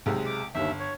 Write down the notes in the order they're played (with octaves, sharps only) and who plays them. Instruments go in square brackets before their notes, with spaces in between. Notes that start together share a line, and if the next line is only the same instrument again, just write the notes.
[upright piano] B1 C3 G#3
[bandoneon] D6
[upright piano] G1 [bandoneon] D#2 E5
[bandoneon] C#5